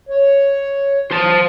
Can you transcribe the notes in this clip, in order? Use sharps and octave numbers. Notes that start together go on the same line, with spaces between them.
C#5
C5 A5